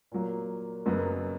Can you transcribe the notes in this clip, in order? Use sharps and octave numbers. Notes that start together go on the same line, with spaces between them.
A#2 F#3 A#3
F#1 F#2 C#3 F#3 B3